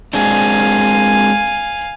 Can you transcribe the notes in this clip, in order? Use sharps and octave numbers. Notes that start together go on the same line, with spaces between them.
G#3 C4 D4 F5 G#5